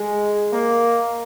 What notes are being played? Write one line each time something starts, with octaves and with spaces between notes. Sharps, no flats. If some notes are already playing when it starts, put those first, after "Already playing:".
Already playing: G#3
A#3